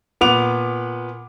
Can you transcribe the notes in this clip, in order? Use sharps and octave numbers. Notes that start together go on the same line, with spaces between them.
A#2 B3 B4 D6 F7